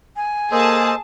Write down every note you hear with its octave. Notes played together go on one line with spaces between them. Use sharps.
G#5
A#3 G#4 A4 C5 D#5 A5